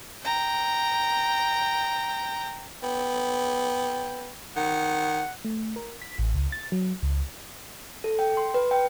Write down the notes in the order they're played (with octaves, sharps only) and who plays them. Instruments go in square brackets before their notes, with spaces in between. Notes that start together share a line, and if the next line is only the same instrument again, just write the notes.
[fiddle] G5 A#5
[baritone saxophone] B3 [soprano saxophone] G5
[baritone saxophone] D#3 [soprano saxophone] F#5
[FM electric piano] A3
A#4
B6
A1
C#2
A6
F#3
C#2
[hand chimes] A4
G5
C6
B4
G5